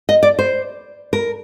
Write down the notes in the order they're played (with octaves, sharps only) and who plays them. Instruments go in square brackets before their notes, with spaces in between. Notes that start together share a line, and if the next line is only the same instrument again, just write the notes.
[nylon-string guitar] D#5
D5
C5
A#4